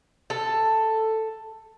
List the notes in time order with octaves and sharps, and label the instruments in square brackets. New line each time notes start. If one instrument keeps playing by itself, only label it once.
[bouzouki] A4